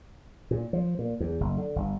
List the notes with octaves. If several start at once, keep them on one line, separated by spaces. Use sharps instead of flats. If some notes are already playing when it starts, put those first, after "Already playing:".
A#2
F3
A#2
E2
F#1
D3
G1